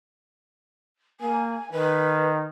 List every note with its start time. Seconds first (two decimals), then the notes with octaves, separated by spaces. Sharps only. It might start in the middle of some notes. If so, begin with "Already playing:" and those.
1.21 A#3 G#5
1.72 D#3 B4